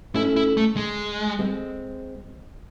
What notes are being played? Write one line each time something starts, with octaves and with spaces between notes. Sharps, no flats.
A3 C#4 E4
E4
A3
G#3
G#3 C4